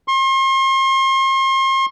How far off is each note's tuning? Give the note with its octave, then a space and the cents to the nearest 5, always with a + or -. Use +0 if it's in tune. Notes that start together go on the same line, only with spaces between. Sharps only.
C6 +40